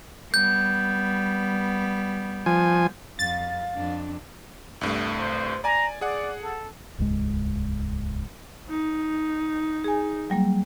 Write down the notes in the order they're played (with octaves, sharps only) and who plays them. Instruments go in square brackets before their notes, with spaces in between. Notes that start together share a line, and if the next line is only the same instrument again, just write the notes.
[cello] G3 B3 [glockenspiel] G6
[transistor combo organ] F3 G#5
[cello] F2 [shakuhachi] F5 [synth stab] A6
[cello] F2 D4
[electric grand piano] C2 G2 A3
[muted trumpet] C5
[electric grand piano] D5 G#5 [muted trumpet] A#5
[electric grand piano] G#4 F#5 [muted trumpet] D5
[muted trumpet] A4
[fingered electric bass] D#1 C#2 G#2 G#3
[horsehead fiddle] D#4
[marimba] G#4 G#5
F#3 G3 A#3